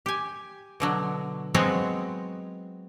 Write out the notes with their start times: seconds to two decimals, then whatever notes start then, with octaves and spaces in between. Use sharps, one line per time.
0.06 G4 G#5
0.80 B2 D3 F#3
1.54 F#3 G#3 B3 C4 C#5 D#5